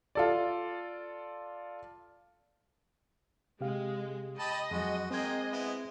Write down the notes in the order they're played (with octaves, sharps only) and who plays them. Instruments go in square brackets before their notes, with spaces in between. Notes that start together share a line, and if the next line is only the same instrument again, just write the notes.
[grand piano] F4 A4 D5
[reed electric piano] C3 G4 F5 [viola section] G#3
[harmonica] G4 A5 B5 [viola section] D#5
[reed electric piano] F2 F#3 [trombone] G#3 [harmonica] F#4
[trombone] G#3 [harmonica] A#3 G5 [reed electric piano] C4 G#6 [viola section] C5 D#5
[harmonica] B3 E4